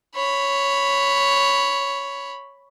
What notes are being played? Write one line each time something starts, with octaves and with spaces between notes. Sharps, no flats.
C#5 B5